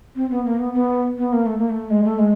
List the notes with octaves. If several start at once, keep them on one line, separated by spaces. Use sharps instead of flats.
C4
B3
A#3
B3
B3
B3
A#3
A3
A#3
A3
G#3
A3
G#3